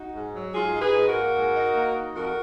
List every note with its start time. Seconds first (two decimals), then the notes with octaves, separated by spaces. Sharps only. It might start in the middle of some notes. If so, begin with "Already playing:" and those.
Already playing: D#4 F#4
0.13 G#2
0.33 F#3
0.54 G#2 F4 G#4
0.74 D#4
0.80 G#4 B4
0.94 G#2
1.08 F#4 A#4
1.15 A#3
1.35 G#2
1.55 D#4
1.75 A#3
1.95 D#4
2.15 F2 F#4 A#4